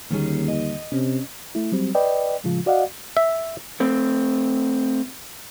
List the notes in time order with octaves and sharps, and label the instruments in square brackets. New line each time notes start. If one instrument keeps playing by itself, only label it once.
[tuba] D#2 [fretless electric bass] D3 G3 A#3 [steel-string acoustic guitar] D#3 C#4 G#4
[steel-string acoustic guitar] D#5
[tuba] C3 [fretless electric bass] C#4
[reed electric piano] A3 E4
F#3 G3 C4
B4 D5 D#5 G5
A2 C#3 F3 G#3 F4
F#4 D5 D#5 F5 F#5
[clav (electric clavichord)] E5
[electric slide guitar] A3 C4